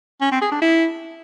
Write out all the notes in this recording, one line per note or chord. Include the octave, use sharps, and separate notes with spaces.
C#4
C4
G#4
D4
E4